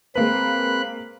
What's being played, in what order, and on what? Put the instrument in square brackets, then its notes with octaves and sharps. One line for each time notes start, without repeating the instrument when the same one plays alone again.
[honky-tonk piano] G#3 A#3 B4 [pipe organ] C4 B5 F#6